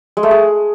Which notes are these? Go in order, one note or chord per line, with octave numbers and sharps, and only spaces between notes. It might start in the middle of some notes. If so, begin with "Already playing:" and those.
G#3
A3
G#3